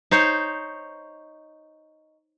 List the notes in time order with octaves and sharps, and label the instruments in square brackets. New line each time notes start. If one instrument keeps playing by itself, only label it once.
[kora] D#4 C5 C#5